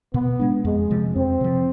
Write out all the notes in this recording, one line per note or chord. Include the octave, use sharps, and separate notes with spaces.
B2 B3
G#3 D4
F2 G#3
C3 F3
F2 C4
C3 F3